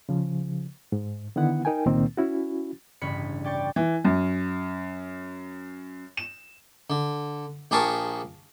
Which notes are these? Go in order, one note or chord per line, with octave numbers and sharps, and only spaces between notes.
C#3 F3
G#2
D3 D#3 B3 E4 F#5
D#4 A#4 G5 G#5
C#2 A#2 D#3 A#3 C4
C#4 E4 F#4
A1 G2 C#3 C#4 B5 C#7
D5 G5 C#6 A6
E3
F#2
E7
D3
A#1 G4 G#4 A#4 A5 C#6